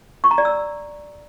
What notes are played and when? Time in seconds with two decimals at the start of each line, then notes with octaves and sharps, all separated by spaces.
0.24 C#6
0.31 A#5
0.38 D5
0.45 E6